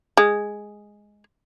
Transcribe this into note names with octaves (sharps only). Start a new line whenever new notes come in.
G#3